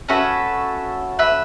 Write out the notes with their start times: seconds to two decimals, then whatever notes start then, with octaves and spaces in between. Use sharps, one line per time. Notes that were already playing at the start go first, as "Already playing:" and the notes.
0.09 C#4 F#4 A4 B4 E5
1.19 B4 E5